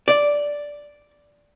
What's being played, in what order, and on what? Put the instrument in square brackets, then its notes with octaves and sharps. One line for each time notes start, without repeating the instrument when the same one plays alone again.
[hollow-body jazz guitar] D5